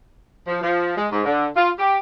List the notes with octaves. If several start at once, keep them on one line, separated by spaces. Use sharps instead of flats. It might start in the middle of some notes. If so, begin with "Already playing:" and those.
F3
F3
G#3
G#2
D3
F4
G4